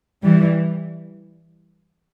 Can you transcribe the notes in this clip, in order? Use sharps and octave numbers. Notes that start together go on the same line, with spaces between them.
E3 G3